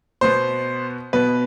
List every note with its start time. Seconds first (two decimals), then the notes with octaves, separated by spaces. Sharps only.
0.21 B2 B3 C5
1.13 B2 B3 B4